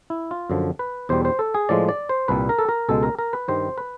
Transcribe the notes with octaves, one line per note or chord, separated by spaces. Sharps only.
E4
F4
F#2 D3 F3
B4
E2 B2 G3 C5
C5
A4
G#4
A2 F3 G#3 D5
D5
C5
C2 A#2 G3 B4
A#4
A4
A#4
C#2 B2 G#3 A4
A#4
A#4
B4
G2 D#3 G3 C5
B4